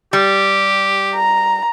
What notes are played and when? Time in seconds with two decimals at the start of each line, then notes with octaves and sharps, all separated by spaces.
0.13 G3 G4
1.14 A#5